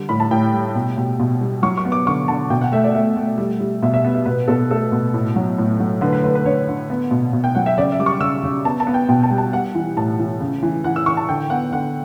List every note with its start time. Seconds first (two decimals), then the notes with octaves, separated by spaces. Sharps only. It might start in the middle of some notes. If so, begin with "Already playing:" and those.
Already playing: D3 G3
0.09 A2 B5
0.20 A5
0.31 A2 G5
0.53 G3
0.75 B2
0.97 B2
1.20 B2
1.41 G3
1.63 F#3 C#6
1.77 C#6
1.85 B3
1.92 D6
2.06 D3 C#6
2.28 D3 A5
2.50 B2 G5
2.61 F#5
2.72 A3 E5
2.84 D5
2.95 A3 E5
3.16 A3
3.38 G3
3.60 G3
3.82 B2 E5
3.94 E5
4.05 B3
4.15 E5
4.26 B2 B4
4.48 B2 A4
4.70 A3 A4
4.92 B2
5.14 A2
5.36 F#3
5.58 A2
5.80 F#3
6.01 D3 B4
6.13 B4
6.24 D3 B4
6.35 B4
6.45 D3 C#5
6.68 D3
6.90 B3
7.11 B2
7.33 B2
7.44 G5
7.55 F#3 F#5
7.66 E5
7.77 C#3 D5
7.92 E5
7.99 G3 D6
8.06 C#6
8.21 C#3 E6
8.43 C#3
8.65 B3 A5
8.80 A5
8.87 B3
8.94 G5
9.09 B2 G5
9.23 A5
9.31 G3
9.38 A5
9.53 G3 F#5
9.75 E3
9.96 A2 A5
10.19 E3
10.40 C#3
10.63 E3
10.84 E3 F#5
10.96 E6
11.06 E3 C#6
11.17 A5
11.29 D3 G5
11.50 B3 F#5
11.72 D3 F#5